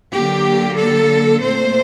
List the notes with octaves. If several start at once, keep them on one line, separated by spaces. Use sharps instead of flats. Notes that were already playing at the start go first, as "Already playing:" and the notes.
D3 F#3 A#3 G4
A4
A#2 A3 C4 C5